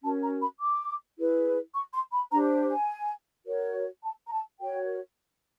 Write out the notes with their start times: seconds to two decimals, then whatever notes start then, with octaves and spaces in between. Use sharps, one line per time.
0.03 C#4 F#4 A#4 A5
0.22 A#5
0.41 B5
0.60 D6
1.17 E4 G#4 B4
1.74 C#6
1.93 C6
2.12 B5
2.31 D4 G4 C5 A#5
2.70 G#5
3.46 F#4 A#4 C#5
4.02 A5
4.26 A#5
4.31 A5
4.60 F#4 A#4 C#5 G5